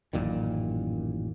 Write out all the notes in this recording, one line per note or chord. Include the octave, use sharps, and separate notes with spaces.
A1 F#2 A#2 D#3